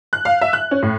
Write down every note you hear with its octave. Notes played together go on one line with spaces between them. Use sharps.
F#6
F5
E5
F#6
C#4
A2